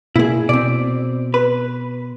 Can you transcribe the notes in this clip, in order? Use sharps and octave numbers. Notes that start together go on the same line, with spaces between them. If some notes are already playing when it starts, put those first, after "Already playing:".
B2 A#3 E4 G#4
B2 C4 D5
B4